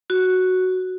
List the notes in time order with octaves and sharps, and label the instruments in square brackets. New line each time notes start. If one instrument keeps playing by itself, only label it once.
[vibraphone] F#4